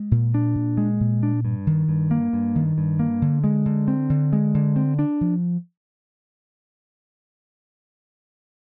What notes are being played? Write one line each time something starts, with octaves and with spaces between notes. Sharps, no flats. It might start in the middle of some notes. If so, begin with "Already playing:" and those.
Already playing: G#3
A#2
D4
A#2
G#3
A#2
D4
G2
D#3
G2
A#3
G2
D#3
G2
A#3
D3
G#3
D3
C4
D3
G#3
D3
C4
D4
F3